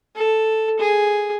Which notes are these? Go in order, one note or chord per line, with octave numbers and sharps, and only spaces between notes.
A4
G#4